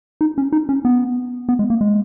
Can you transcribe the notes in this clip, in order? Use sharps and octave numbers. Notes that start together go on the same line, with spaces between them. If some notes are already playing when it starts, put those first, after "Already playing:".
D#4
C#4
D#4
C#4
B3
B3
G#3
A#3
G#3